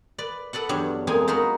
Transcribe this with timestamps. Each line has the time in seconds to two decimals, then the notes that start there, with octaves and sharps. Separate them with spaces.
0.18 B4 D5
0.53 A4 B4 D5 F#5
0.69 E2 G2 F#3 G3 D4
1.07 F2 G#3 A#3 G#5
1.28 D#4 F4 F#4 A#4 B4